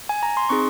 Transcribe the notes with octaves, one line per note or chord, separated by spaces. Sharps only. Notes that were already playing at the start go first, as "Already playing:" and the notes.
G#5
A#5
C6
C4 D#4 G#4 C#6